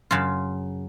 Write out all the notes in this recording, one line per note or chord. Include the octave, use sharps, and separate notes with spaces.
F#2 C#3 F4